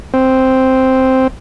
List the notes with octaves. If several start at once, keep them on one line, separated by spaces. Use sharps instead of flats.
C4